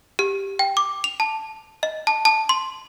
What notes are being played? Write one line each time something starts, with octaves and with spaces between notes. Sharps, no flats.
G4
G5
D6
F7
A5
D#5
A5
A5
C6